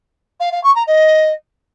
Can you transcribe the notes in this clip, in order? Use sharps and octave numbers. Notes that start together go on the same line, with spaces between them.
F5
F5
C#6
A#5
D#5